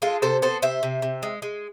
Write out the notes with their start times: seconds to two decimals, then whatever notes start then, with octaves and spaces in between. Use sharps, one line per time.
0.02 G#3 F4 A4
0.22 C3 A4 C5
0.42 B3 A4 C5
0.62 C3 C5 E5
0.83 C3
1.02 C3
1.23 G#3
1.42 G#3